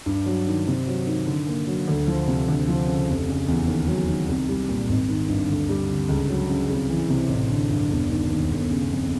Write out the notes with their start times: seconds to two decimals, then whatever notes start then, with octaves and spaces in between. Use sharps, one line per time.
0.06 G2
0.26 F#3
0.47 D#3
0.67 C3
0.87 F#3
1.07 D#3
1.27 D3
1.47 A#3
1.67 F#3
1.88 D2
2.07 F3
2.27 C3
2.48 D2
2.68 F3
2.88 C#3
3.08 F1
3.28 C#3
3.48 E2
3.67 D#2
3.88 F#3
4.08 D#3
4.28 C2
4.49 G3
4.69 A#2
4.89 G#1
5.08 D#3
5.29 G2
5.49 D2
5.69 G3
5.89 D3
6.09 C#2
6.29 F#3
6.48 C#3
6.70 C2
6.90 E3
7.10 C3
7.29 A1
7.50 D3
7.70 G2
7.90 E1
8.10 D#3
8.30 D#2
8.50 G1
8.70 C#3
8.90 F2